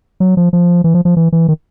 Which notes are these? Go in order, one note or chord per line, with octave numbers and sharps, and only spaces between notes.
F#3
F3
F3
E3
F3
F3
E3
E3
D#3